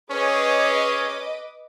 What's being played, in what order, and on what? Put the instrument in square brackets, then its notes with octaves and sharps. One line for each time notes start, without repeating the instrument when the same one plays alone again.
[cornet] C#4 [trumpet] G#4 [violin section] B4 D#5 D6 [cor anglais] C#5